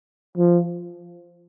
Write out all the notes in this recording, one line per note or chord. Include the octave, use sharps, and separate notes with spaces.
F3